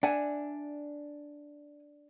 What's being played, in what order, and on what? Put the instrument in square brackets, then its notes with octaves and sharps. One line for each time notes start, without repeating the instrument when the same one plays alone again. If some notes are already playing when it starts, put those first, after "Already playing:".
[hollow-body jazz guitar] D4 [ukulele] E5 F#5 G#5